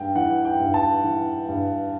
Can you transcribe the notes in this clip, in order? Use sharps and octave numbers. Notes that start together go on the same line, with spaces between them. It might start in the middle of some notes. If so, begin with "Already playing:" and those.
Already playing: G2 G5
E3 F#5
G5
G2
A5
E3
G2